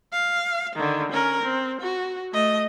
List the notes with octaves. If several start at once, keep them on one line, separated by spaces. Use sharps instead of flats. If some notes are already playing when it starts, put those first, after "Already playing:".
F5
D3 D#3
C#4 A#4
C4
F#4
A3 D#5